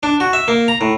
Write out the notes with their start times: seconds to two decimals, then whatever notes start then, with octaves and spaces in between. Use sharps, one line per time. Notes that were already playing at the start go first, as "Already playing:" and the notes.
0.03 D4
0.20 F#4
0.33 E5
0.48 A#3
0.68 A#5
0.81 A2